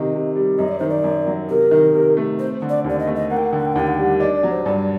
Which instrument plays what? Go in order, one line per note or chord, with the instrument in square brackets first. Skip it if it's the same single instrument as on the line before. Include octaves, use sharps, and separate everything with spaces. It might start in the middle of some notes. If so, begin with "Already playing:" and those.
Already playing: [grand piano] C3 D#3 [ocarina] D#5
[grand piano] C3
G3
[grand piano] F#2 [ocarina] D#5
[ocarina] D5
[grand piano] D#3 [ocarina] C5
[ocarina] D5
[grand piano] F#2
F#3
[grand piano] C3 [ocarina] A#4
[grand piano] D#3
C3
A3
[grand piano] C4 [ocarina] C5
[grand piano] D3
[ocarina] D5
[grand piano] D#2
[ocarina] D5
D#5
[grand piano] A3
[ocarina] D#5
[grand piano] A#3 [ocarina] F#5
[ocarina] G5
F#5
[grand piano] D3 [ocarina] G5
[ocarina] F#5
G5
F#5
[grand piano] D#2 [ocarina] G5
[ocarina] F#5
G5
[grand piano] G3 [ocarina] F#5
[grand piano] D4 [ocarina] D#5
[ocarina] D5
[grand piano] F#3
[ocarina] C5
[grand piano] G2 [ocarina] D5